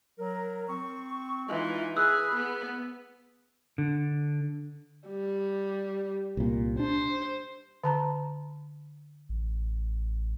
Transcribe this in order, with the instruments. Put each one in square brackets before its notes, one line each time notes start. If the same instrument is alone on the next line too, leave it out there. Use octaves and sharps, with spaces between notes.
[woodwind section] F#3 A#4
C4 C#6
[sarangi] E3 [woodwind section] G#3 D#4 F4
[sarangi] G#4 [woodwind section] B4 [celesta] D#6 E6 F#6
[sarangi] B3
[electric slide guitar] D3
[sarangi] G3
[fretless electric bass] C2 A#2
[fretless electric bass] D4 [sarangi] C5
[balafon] D3 A5 A#5
[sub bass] A1